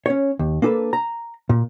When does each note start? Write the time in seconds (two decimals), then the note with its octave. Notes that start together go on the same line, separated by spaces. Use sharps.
0.06 C#4 C#5
0.39 D#2
0.62 A#3 D4 G#4 A4 B4
0.93 A#5
1.49 A#2